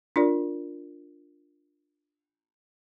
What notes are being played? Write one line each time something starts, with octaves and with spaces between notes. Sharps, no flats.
D4 F4 A#4 D5